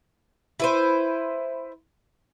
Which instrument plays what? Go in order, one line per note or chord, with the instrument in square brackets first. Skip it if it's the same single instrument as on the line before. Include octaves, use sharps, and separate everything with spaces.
[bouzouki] E4 B4 C5